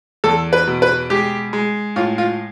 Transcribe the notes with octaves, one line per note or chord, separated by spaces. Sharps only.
E2 A4
B4
B2
B4
G#3 G4
G#3
A2 F4
F4